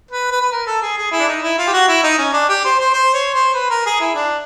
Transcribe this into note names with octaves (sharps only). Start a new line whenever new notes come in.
B4
B4
B4
A#4
A4
G#4
G#4
E4
D4
D#4
E4
F4
G4
F#4
E4
D#4
C#4
D4
G4
C5
C5
C5
C#5
C5
B4
A#4
G#4
E4
D4